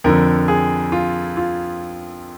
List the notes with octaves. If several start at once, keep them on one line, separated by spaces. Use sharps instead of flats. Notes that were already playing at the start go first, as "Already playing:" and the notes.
F2 D3 F3 A#4
G#4
F4
F4